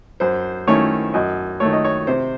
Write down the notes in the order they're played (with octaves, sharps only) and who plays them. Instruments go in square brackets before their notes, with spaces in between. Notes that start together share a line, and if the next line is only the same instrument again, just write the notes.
[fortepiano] F#2 C5
D#3 A3 C#4 E4 C#5
F#2 D#5
D#3 A3 C#5
D#5
C#5
C3 C5